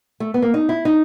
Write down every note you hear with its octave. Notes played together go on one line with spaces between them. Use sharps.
A3
B3
A#3
D#4
E4
D#4